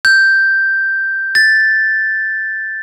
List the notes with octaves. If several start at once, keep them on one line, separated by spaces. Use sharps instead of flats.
G6
A6